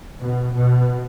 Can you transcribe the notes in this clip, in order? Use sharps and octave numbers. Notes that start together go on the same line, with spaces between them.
B2
B2